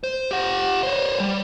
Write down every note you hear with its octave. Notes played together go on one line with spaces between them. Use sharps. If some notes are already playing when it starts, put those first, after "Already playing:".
C5
G4 F#5
C5 C#5
G3